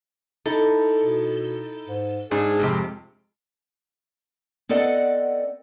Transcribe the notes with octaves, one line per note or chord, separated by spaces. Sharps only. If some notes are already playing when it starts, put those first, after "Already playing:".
D#4 E4 A4
B2
G#2
G#2 D4 G#4
F2 G#2 C3 G#3 G4
B3 C4 A4 D5 D#5 F#5